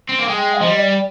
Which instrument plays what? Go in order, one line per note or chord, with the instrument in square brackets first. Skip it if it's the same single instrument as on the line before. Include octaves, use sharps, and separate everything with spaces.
[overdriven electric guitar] C4
A#3
[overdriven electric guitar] G#3 [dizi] G5
[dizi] D#5
[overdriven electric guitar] F3
G3
[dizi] D5